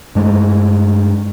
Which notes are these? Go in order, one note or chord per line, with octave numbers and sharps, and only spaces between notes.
G2 G#3 A3